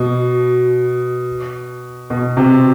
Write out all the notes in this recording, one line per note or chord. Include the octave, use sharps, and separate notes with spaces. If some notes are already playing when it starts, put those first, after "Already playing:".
Already playing: B2
B2
C3